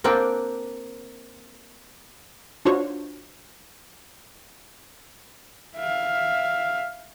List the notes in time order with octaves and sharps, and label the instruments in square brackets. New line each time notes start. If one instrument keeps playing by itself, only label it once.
[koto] A#3 C4 D4 F#5 G5
[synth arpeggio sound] D4 D#4 F4 F#4 C5 C#5
[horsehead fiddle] E5 F5